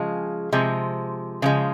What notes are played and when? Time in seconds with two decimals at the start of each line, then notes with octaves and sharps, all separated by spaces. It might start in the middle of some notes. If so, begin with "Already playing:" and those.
Already playing: C#3 F3 G#3
0.52 C3 F3 G#3
1.42 C#3 F3 G#3